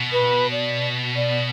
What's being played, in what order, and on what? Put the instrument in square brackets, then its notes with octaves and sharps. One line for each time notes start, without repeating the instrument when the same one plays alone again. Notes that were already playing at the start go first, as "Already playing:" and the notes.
Already playing: [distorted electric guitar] B2
[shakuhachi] B4
D5
D5